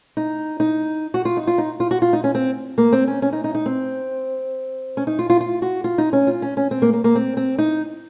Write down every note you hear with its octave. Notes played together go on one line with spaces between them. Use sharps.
D#4
D#4
F#4
F4
D#4
F4
D#4
F4
F#4
F4
D#4
C#4
C4
A#3
C4
C#4
C#4
D#4
D#4
D#4
C4
C#4
D#4
F4
F4
F4
F#4
F4
D#4
C#4
F4
C#4
C#4
C4
A#3
A#3
A#3
C4
C4
D#4